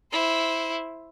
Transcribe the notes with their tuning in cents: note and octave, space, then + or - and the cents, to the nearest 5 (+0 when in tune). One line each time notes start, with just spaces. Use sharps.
E4 -5 C5 +0